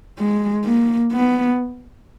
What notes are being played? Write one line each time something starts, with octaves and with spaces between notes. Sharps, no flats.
G#3
A#3
B3